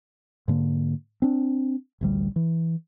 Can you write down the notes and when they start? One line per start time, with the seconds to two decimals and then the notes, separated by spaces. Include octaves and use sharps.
0.48 G#2 D3 A#3
1.22 C4 D4
2.01 A1 D2 G3
2.36 E3